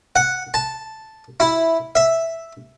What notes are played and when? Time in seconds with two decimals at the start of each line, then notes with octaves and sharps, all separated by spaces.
0.16 F#5
0.54 A5
1.40 E4
1.95 E5